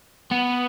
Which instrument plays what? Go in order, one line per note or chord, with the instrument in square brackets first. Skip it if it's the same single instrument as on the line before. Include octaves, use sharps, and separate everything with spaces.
[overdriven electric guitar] B3